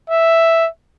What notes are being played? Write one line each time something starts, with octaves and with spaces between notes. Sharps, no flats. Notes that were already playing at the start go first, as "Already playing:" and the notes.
E5